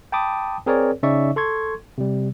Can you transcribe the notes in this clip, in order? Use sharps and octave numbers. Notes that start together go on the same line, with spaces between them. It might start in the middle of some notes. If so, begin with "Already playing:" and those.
G5 A5 B5 D6 D#6
C4 G#4 A#4 C#5 D5
C#3 C#4 D#4 D5 E5 C#6
A4 C6 C#6 G#6
C3 G3